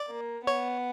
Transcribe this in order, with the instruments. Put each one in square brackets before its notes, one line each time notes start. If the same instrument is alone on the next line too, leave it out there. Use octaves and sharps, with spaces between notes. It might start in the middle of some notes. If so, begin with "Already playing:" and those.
Already playing: [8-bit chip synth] D5
[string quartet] A#3
[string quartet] B3 [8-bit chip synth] C#5